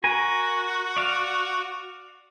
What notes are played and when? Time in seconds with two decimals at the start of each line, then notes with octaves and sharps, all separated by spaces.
0.04 F#4 A#4 G#5
0.97 D5 F5